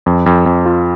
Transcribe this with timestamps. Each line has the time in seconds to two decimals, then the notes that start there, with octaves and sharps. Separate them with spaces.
0.06 F2
0.26 F2
0.46 F2
0.66 F4